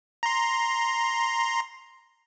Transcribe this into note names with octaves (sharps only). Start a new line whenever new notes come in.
A#5 C6